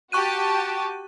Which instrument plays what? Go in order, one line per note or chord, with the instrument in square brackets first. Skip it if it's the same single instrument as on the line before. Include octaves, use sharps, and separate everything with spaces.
[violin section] F#4 G4 A5 [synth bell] C#6 F#6 D#7